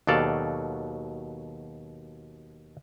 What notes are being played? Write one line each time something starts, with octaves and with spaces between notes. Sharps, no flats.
D#2 B2 F#3 A4 D5 F5